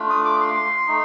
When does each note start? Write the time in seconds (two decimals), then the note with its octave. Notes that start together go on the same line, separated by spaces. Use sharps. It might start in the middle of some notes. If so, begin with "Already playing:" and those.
Already playing: A3 D4 F4
0.10 D#6
0.25 D6
0.41 C6
0.87 A3 D#4